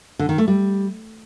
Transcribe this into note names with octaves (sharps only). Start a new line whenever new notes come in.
D3
D#3
A3
G3